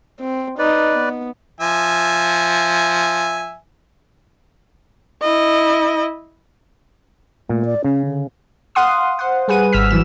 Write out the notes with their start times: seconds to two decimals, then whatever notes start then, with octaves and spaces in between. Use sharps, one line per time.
0.20 C4
0.59 D#4 B4 D5
0.94 B3
1.60 F3 E5 G#5
5.22 E4 D#5
7.49 A#2 A3
7.65 D5
7.84 C#3 C#4
8.05 D3
8.75 F5 F#5 C6 D#6
9.19 C5 F#5
9.48 G3 G#4 B4 F#5 D#7
9.73 G#1 E6 F6 B6
9.90 G#1 E3 F#3 E7